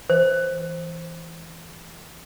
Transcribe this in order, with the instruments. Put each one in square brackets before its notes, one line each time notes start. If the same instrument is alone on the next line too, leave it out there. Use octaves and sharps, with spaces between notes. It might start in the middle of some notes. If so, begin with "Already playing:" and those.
[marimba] E3 [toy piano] C5